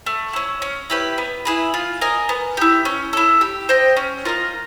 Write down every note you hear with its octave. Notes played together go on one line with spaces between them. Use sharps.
A3
C#4 E4
C#4
E4 G4 B4
B3
E4 G#4 B4
F4
A#4 D#5 G#5
B3
E4 G4
C#4
E4 A4
G4
C5 D#5 G5
C#4
F4 A#4 D#5